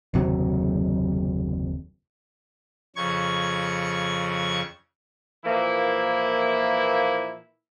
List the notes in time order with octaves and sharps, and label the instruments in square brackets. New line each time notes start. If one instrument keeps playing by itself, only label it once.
[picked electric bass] F#1 D#2 C3 F#3
[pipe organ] F2 C#3 C#6 G#6
[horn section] A#2 E3 F3 A#3 E4